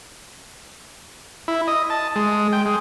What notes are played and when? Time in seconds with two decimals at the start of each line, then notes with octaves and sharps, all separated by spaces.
1.48 E4
1.67 D#5
1.90 A5
2.16 G#3
2.52 G5
2.66 G#3